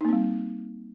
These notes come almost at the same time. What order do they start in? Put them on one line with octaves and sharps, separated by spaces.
D#4 A#3 C4 G3